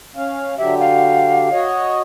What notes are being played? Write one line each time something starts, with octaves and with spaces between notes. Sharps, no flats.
C#4 F5
D3 F#3 G4 E5
F5
F#4 C#5 D#5